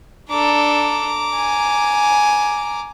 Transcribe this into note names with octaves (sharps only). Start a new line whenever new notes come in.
D4 A4 A#5 D6
G#5